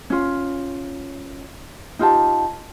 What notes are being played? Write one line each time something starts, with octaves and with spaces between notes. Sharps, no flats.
C#4 F4
D#4 F4 G4 A5